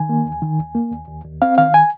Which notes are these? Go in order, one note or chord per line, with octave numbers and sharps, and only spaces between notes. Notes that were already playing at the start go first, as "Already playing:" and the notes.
Already playing: D#3 G#5
A#3
D#2
D#3
D#2
A#3
D#2
D#2
D#2
C4 F5
D#3 F5
G#5